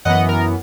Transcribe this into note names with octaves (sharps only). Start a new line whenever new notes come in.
F#2 E3 B3 D#5 F#5
A#4